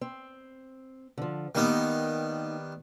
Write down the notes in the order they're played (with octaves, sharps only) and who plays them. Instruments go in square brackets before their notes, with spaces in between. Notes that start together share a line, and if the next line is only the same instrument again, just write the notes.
[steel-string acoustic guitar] C4
D3 F3
[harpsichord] D#3 G3 B3 [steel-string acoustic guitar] A#3 D#4